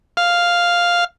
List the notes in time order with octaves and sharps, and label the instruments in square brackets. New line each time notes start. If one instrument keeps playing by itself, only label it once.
[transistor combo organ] F5